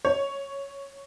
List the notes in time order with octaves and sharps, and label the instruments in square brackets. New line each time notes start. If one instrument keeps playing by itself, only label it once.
[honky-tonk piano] C#5